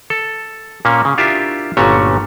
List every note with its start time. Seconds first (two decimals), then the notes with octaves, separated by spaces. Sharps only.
0.10 A4
0.85 A#2 A#3 C#4
1.05 C#3
1.18 D4 E4 F4 G4 A#4 E5
1.77 G1 A#2 A3 C#4 F#4 C#5